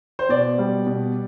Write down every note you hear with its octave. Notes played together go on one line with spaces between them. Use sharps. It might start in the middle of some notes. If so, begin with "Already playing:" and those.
C5
B2 D5
G3
B2